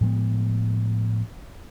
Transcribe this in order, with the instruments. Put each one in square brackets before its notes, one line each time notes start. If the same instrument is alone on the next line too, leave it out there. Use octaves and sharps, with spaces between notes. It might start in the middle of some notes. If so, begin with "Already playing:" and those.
[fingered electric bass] A2 F3 G#3 B3